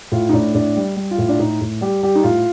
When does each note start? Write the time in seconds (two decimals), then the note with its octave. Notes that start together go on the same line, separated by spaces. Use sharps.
0.12 A2 F4
0.29 D#4
0.33 A2 D4
0.54 A2 D4
0.76 G3
0.96 G3
1.11 F4
1.18 A2
1.29 D4
1.39 A2 D#4
1.61 A2
1.81 G3 G4
2.03 G3 G4
2.15 D#4
2.24 A2 F4